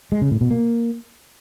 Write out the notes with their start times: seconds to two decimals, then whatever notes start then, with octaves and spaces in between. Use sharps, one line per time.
0.12 G#3
0.22 C#3
0.31 A2
0.41 B2
0.51 A#3